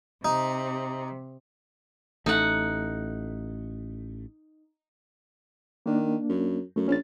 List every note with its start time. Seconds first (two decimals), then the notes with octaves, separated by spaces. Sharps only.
0.25 C3 D#4
2.26 A1 A3 D#4 F#5
5.86 D#3 A#3 D4
6.29 F#2
6.76 F#2 A3
6.88 A#1 C#4 A6